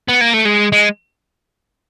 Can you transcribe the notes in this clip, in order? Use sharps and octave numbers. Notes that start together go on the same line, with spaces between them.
B3
A#3
A3
G#3
G#3